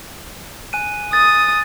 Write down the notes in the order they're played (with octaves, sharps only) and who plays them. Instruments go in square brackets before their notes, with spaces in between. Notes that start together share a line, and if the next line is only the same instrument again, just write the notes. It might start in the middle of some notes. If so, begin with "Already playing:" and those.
[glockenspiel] G#5 F#6 D#7
[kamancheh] D#6 [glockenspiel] A6